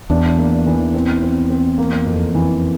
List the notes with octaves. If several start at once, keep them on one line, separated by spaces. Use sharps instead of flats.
E2 D4
A#3
E3
C4
C4
C4
A#3
F2
E3